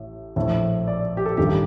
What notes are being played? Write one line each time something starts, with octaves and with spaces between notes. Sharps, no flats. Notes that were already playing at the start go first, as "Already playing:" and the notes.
Already playing: A1 A2
A#1 A2
D5
G4
A4
A1 G2 D#3 G4